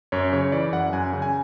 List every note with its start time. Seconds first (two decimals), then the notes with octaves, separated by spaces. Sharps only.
0.12 F#2 C#5
0.33 C#3 C#5
0.52 E3 D5
0.73 F#2 F#5
0.93 F#2 G#5
1.13 C#3
1.22 G#5